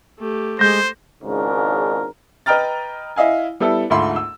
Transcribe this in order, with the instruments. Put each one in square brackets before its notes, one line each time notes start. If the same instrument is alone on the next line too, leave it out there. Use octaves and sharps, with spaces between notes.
[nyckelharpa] A3 G4
[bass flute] G#3 [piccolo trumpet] C5 [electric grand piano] G6 A#6
[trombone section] G#1 C#2 G#2 C#3 D4 A#4
[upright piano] B4 D#5 G5 A#5 F6 A6
E4 D#5 F5 G#5
G3 B3 E4 A4
D2 G#2 A3 F4 B5 C6
E6